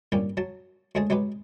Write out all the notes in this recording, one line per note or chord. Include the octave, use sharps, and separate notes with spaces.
G2 A#2 G3 C#4 G4
F#3 A5
D2 G#3 G#4 C#5 A5
F#3 G#3 G4 B4